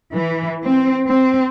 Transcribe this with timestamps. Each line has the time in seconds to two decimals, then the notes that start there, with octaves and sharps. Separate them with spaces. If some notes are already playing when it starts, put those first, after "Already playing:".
0.13 E3
0.64 C4
1.09 C4